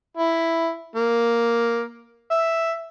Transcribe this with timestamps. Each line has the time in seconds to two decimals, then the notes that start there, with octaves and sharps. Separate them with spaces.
0.17 E4
0.96 A#3
2.31 E5